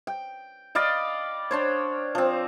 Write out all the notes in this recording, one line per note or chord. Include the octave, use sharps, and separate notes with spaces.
G5
D5 D#5 F5 B5
D4 C5 C#5
F3 C4